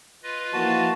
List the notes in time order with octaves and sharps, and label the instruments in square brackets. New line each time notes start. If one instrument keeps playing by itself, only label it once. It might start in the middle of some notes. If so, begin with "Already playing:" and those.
[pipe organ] F4 B4 D#5
[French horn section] E3 F3 A#3 [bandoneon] F#4 A5